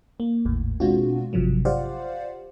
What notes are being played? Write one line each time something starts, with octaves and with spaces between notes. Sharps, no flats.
A#3
G#1 D#2 A2
B2 G#3 C4 D4 F4 F#4
G#1 G2 C3 F3 F#3
F4 G4 C5 D5 F5 F#5